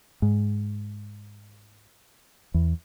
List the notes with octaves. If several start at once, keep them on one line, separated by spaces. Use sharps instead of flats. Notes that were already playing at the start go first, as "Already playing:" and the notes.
G#2
E2